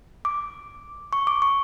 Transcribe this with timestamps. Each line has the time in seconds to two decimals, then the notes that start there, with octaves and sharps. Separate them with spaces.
0.25 D6
1.13 C#6
1.27 D6
1.42 C#6